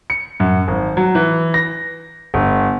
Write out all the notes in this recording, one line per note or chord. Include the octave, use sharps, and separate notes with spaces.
C#7
F#2
G#1
F#3
E3
A#6
G1